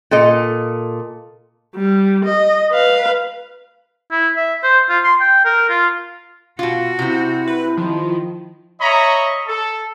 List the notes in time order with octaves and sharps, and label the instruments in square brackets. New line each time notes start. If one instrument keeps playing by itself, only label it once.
[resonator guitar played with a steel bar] A#2 A4 D#5
[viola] G3
D#5
B4 F5
[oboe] E4
E5
C5
F4
C6
G5
A#4
F4
[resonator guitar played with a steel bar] B2 F4 [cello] F#4
[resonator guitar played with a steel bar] C3 C4 [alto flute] E4
[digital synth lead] B4
[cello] D#3 [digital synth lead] F3
[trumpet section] C#5 D#5 E5 A#5 B5 C#6
A4